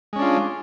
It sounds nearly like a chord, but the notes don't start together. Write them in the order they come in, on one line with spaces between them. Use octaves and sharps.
G#3 C#4 D4 F4